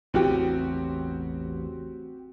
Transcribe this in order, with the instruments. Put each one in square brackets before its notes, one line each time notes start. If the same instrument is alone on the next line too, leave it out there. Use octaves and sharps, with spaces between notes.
[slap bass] A1 E2 C#3 [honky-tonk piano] C4 F#4 G4